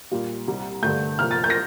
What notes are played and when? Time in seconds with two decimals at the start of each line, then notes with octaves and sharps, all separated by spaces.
0.11 A#2 G3 A#3
0.48 C2 C3 G3
0.83 G2 D3 A3 G6
1.19 C2 A#2 F3 A#3 F6
1.31 A6
1.44 G6
1.50 A#6